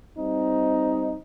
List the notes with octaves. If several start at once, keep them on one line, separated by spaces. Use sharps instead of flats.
G3 C4 D#4